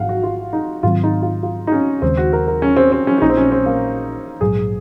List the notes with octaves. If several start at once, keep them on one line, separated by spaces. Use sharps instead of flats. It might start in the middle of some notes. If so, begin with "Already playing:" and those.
Already playing: G#1 G#2 F3 F5 F#5
F#4
F4
D#4
G#2 D#3 F#3 C4 F4
D#4
F4
F4
D#4
C#4
D#2 C#3 G#3 C4
F#4
A#4
A#4
C#4
C4
C4
C#4
C#4
A#1 A#2 F3 D#4
C4
C#4
C4
A#3
A#1 G#2 F#3 G#4